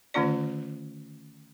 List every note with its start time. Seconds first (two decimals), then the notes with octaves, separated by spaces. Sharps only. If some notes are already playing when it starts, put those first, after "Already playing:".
0.14 D3 D#3 A3 C#4 F4 D5